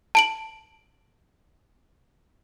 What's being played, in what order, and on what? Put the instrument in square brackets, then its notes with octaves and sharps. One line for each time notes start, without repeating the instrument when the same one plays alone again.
[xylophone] A5 D7 F#7